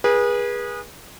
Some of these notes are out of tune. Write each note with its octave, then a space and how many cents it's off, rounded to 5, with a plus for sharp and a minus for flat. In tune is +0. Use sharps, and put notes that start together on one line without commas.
G#4 -20 B4 -35